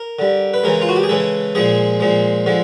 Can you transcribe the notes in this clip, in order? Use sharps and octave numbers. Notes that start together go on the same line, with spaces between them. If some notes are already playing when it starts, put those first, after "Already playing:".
Already playing: A#4
D3 G3
B4
C#3 E3 G#3 A#4
F4
F#4
G4
G#4
C#3 E3 G#3 A4
A#2 F3 G#3 G#4
A#2 F3 G#3
D3 F3 G#3